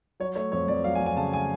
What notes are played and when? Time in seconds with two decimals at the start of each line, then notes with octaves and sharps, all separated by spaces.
0.20 F#3 C#5
0.35 A3 C#5
0.52 F2 C#5
0.68 F2 D5
0.84 F#3 F5
0.95 G#5
1.00 F2
1.06 G#5
1.16 C#3 A5
1.33 G#5